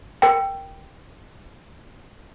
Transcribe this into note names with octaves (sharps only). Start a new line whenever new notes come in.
A#4 G5